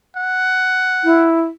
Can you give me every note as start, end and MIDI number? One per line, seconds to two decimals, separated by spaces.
0.16 1.26 78
1.04 1.42 64